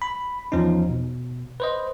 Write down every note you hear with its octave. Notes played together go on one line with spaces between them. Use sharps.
B5
E2 F3 C#4 D#4
B2
B4 C5 D#5